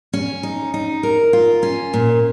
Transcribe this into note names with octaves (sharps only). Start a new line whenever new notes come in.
C#4
D#4
D#4
A#4
F4
C#4
A#2